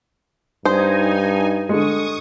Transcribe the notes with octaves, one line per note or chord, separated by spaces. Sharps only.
G2 D#4 C5 G#5
D3 G#3 C#6 D#6